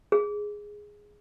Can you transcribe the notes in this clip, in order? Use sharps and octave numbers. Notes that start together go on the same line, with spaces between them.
G#4